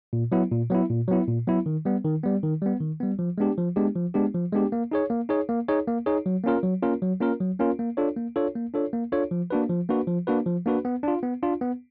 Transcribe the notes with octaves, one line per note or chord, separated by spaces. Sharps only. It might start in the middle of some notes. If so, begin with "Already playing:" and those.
A#2
F#3 B3 E4
A#2
F#3 B3 E4
A#2
F#3 B3 E4
A#2
F#3 B3 E4
D#3
G3 B3
D#3
G3 B3
D#3
G3 B3
D#3
G3 B3
F3
G#3 B3 D4 G4
F3
G#3 B3 D4 G4
F3
G#3 B3 D4 G4
F3
G#3 B3 D4 G4
A#3
D#4 G#4 C#5
A#3
D#4 G#4 C#5
A#3
D#4 G#4 C#5
A#3
D#4 G#4 C#5
F#3
A#3 C#4 F4 A#4
F#3
A#3 C#4 F4 A#4
F#3
A#3 C#4 F4 A#4
F#3
A#3 C#4 F4 A#4
A#3
D4 F4 A4 C#5
A#3
D4 F4 A4 C#5
A#3
D4 F4 A4 C#5
A#3
D4 F4 A4 C#5
F3
A#3 D4 F#4 B4
F3
A#3 D4 F#4 B4
F3
A#3 D4 F#4 B4
F3
A#3 D4 F#4 B4
B3
D4 F4
B3
D4 F4
B3